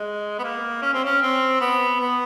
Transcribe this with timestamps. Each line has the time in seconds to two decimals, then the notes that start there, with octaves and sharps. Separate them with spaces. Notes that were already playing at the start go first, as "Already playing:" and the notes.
Already playing: G#3
0.39 B3
0.44 A#3
0.82 C#4
0.94 C4
1.05 C#4
1.22 C4
1.61 B3
2.00 B3